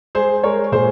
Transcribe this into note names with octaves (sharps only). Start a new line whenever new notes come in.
G#3 G#4 C5
G#3 A#4 C#5
A#2 G#4 C5